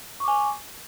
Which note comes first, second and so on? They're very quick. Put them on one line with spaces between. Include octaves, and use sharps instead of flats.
C#6 D6 G#5